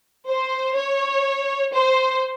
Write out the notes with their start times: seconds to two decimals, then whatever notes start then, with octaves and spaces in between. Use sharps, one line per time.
0.27 C5
0.75 C#5
1.72 C5